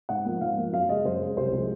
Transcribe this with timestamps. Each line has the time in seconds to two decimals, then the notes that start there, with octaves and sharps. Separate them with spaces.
0.09 G#2 F#5
0.25 F3 A#3
0.41 G#2 F5
0.57 F3 A#3
0.73 F#2 F5
0.89 C#3 G#3 D#5
1.05 F#2 C5
1.21 C#3 G#3
1.37 C2 C5
1.53 C3 F3 G#3